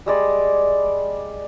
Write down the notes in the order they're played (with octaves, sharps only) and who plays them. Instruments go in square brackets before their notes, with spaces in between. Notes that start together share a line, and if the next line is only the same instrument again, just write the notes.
[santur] G3 G#3 D5